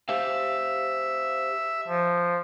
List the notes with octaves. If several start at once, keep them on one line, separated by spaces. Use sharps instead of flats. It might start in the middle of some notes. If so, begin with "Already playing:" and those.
G4 C5 E5 F5
F3